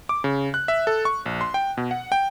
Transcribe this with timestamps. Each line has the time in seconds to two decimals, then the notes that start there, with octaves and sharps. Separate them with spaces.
0.09 D6
0.24 C#3
0.54 F#6
0.68 E5
0.87 A4
1.05 C#6
1.26 A#1
1.41 C6
1.54 G5
1.77 B2
1.91 F#5
2.12 G5